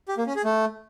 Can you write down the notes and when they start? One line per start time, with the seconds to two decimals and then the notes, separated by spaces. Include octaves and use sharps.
0.08 G4
0.17 A#3
0.27 C#4
0.36 G#4
0.45 A3